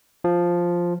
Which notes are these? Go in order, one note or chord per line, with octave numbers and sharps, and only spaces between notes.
F3